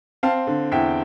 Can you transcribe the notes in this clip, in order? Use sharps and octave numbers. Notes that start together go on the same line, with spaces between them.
C4 F5 A5
D3
E2 E5 G5